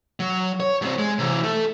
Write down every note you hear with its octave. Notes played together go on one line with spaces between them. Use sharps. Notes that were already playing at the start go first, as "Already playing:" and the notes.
F#3
C#5
G2 C4
G#3
C3 E3
A4 E5